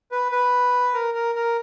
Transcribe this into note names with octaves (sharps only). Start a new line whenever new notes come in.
B4
B4
A#4
A#4
A#4